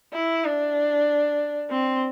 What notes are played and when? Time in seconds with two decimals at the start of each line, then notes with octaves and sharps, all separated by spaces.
0.13 E4
0.45 D4
1.71 C4